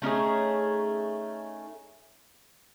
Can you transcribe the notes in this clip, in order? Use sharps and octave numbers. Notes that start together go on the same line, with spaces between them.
A3 C#4 D#4 G#4